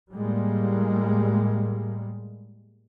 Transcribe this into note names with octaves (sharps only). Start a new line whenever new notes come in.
A2 G3 G#3 A#3